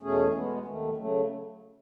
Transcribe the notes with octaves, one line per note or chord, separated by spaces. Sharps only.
E2 B2 A3 C#4 G#4
B2 G#3 B3
D#2 D#3 A3
C#3 F#3 A3